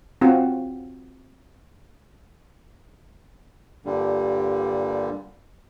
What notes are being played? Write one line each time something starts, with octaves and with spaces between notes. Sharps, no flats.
C4 F4 F#4 F#5
G2 A#2 D3 G3